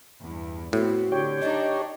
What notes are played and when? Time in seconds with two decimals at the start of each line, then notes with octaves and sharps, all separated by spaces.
0.22 E2 G2
0.73 A2 B3 C4 F#4
1.12 D3 G4 C#5 G5
1.42 D4 D#4 D#5